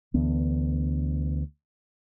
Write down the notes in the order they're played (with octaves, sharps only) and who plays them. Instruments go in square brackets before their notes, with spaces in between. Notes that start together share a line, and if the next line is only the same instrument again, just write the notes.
[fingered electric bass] D2 E3 B3 D4